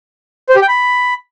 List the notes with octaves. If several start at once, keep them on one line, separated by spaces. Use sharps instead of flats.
C5
G4
G5
B5